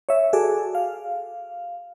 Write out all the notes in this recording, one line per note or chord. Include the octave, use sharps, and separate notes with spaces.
C#5 E5
F#4 G#4 A4 D5
F5